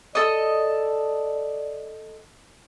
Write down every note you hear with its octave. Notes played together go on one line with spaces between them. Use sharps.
A4 D5 D#5